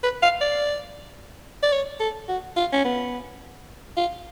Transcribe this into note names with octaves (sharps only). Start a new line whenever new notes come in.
B4
F5
D5
D5
C#5
A4
F#4
F4
C#4
B3
F4